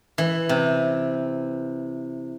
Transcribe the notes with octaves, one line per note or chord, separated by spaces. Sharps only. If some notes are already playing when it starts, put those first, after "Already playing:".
E3
C3